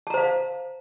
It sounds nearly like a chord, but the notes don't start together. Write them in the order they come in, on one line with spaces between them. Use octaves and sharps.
A5 A#5 C5 F5